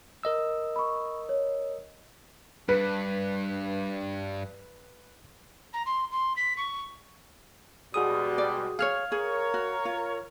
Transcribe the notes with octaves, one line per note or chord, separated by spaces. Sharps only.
A#4 D#5 E6
B5 C#6
C#5
G2 B4
A#5
C6
C6
B6
C#6
B2 G3 G#3 F#4 G#4 D#6
D5
G#4 C#5 F5 F6 G#6
G#4 A#4 C#5
F#4
F4